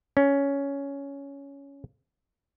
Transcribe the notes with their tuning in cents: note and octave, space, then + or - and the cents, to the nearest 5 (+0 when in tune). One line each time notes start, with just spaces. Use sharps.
C#4 +10